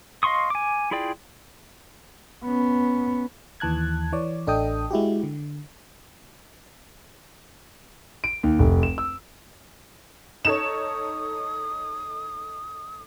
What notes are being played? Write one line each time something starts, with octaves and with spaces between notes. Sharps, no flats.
D#5 F5 C6 C#6 D#6
G#5 D6
E4 F4 G#4 D5 G5
B3 C#4
D#2 E3 A5 F#6 G#6
E3 C#5 D5
A1 D4 A4 D#5 G5 D#6
G#3 E4 F#4 G4
D3
D7
D#2
F1
E7
E6
D#4 A4 C#5 D#6 E7